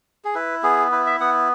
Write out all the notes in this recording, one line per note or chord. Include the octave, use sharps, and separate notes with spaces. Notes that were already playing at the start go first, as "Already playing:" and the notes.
G#4
E4 B4
B3 G#4
E4 B4
E5
B3 F#5